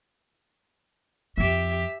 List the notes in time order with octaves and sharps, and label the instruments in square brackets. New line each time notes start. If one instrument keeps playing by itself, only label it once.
[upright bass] F2 F3 [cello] G4 E5